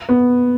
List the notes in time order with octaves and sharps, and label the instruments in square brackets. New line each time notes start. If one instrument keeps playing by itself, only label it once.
[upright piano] B3